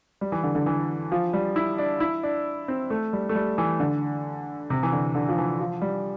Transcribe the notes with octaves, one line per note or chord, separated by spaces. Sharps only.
G3
E3
D3
D3
E3
F3
G3
E4
D4
E4
D4
C4
A3
G3
A3
G3
E3
D3
C3
E3
D3
D3
F3
E3
F3
G3